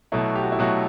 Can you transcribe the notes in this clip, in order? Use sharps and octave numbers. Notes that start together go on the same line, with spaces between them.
B2 F#3 A3 E4
G4
F#4
E4
B2 F#3 A3 F#4